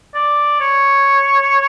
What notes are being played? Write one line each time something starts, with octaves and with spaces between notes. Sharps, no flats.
D5
C#5